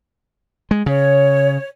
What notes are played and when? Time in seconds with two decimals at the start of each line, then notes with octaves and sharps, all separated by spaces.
0.71 G#3
0.86 C#3 C#5